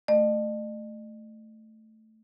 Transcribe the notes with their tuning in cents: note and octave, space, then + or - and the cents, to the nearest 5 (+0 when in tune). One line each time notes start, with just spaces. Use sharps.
A3 +0 D#5 -45